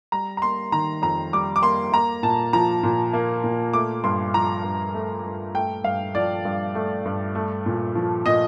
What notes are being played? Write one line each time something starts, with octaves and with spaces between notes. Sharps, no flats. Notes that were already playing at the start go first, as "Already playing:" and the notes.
G3 A#5
A#5
A#3 C6
D#3 A#5
F2 A#5
G3 D6
D6
A#3 C6
A#3 A#5
A#2 A5
F3 A#5
A#2
A#3
A#2
A3 D6
G2 C6
F3 A#5
G2
A3
G2
A3 G5
G2 F5
F3 D5
G2
A3
G2
A3
A#2
F3
A#2 D#5